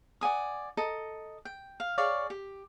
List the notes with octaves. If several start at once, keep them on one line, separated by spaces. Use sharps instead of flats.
D5 F#5 G#5 D#6
A4 D#5 A#5
G5
F5
G#4 C#5 D5 F5
G4